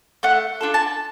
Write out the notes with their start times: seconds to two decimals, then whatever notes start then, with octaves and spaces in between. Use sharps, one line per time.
0.23 A3 F#5
0.61 D4 F4 A4
0.74 A5